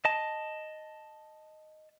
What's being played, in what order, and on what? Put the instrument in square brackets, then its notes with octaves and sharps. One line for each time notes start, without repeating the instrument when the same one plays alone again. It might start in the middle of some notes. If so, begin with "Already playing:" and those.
[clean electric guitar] D#5 A5